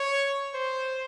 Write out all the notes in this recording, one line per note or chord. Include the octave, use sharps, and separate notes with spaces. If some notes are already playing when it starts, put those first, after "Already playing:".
Already playing: C#5
C5